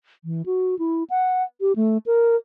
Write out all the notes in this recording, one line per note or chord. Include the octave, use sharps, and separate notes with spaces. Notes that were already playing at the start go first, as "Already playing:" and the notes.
E3
F#4
E4
F#5
G4
A3
A#4